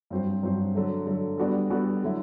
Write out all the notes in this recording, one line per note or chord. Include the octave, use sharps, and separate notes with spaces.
G2 F#3 C4 F#4 C5
G2 F#3 C4 F#4 C5
D3 F#3 A3
D3 F#3 A3
G3 B3 D4 F#4 A4
G3 B3 D4 F#4 A4
D3 F#3 A3 E4